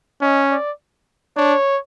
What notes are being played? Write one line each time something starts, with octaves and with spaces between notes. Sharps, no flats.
C#4 D#5
D5
D4 C#5